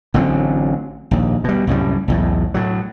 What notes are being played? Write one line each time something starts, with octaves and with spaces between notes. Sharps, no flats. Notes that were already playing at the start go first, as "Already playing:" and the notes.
A1 D3 F#3 C4
A#1 D#2
B2 G3
C2 F#2 A2 G3
B1 E2 A2
A2 F#3